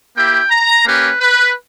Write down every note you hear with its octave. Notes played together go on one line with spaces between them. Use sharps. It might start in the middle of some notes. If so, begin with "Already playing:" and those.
A#3 E4 G4 G5
A#5
A#3 C#4 G4 B4
B4